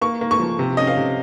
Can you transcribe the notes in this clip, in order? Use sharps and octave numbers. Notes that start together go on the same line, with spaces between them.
A#3 C#6
A#3
C#6
F3
C3
C#4 D#5
F5
C3